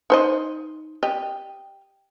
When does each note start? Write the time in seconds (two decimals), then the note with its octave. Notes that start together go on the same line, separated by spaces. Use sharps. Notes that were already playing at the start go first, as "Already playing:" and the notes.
0.10 D#4 C5 D#5
1.03 G4 D#5